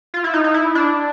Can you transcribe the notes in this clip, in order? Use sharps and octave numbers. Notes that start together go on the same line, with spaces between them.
F4
E4
D#4
D#4
E4
D4